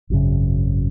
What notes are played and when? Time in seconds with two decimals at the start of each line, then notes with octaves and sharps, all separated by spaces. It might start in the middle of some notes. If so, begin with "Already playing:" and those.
0.10 G#1 F#2 C#3